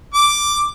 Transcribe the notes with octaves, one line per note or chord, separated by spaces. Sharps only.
D6